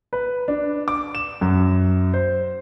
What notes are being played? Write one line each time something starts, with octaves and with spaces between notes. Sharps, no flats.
B4
D4
D6
E7
F#2
C5